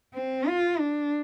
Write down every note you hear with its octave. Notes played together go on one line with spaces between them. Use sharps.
C4
F4
D4